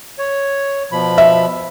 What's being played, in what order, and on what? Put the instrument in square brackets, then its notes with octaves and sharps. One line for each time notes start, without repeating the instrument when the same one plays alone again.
[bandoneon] C#5
B2 F3 B5
[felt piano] E5